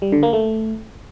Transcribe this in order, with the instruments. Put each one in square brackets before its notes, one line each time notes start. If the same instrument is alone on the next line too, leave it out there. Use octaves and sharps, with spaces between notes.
[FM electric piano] G3
D3
A#3
A3